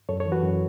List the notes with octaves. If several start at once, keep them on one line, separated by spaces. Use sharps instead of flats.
F#2 A4 C#5
A4 C#5
E3
F#4 B4
F#2